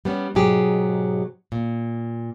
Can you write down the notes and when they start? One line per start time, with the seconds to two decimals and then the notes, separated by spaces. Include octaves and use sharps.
0.05 G3 B3 C#4
0.35 G#2 B2 F#3 G4 G#4
1.52 A#2